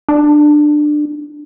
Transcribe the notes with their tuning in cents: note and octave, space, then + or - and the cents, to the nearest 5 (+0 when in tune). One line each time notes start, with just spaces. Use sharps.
D4 +20